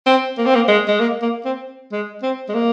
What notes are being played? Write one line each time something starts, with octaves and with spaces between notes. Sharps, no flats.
C4
A#3
C4
A#3
G#3
G#3
A#3
A#3
C4
G#3
C4
G#3
A#3